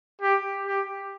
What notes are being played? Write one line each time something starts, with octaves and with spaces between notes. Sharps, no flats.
G4
G4